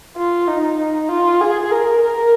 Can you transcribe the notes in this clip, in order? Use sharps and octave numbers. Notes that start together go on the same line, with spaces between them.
F4
D#4
D#4
F4
G#4
A#4
A#4